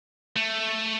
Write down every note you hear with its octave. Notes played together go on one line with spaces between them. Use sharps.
A3